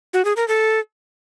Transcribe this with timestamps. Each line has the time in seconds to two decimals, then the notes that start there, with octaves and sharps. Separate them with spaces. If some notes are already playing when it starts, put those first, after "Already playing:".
0.13 F#4
0.25 G#4
0.36 A#4
0.48 A4